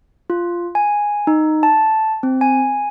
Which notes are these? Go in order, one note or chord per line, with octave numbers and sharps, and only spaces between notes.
F4
G#5
D#4
A5
C4
G#5